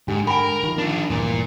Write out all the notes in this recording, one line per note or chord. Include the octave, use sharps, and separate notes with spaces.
G#2 D3 G4
A#4 G5 B5
D#3 F3
D4 F4
D2 G2 A#2 E3 A#4